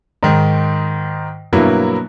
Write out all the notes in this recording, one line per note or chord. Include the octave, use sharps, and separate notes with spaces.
G#2 D#3
G2 B2 F#3 A#3 B3 E4